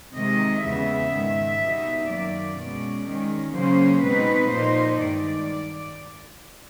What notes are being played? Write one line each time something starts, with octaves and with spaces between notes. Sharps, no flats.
C3 D#3 G#3 D#5
E2 C#3 E3 G#3 B3 E5
G#2 D#3 G#3
B2 G3 B3 D#4
F#2 D#3 F#3 A#3 D5
B2 G#3 C#4
D#3 G#3 C#4
C#3 F#3 A#3 C#4 C5
B2 G#3 C4 D#4 B4
A#2 F3 A#3 D#4 C5
G2 D#3 G#3 D5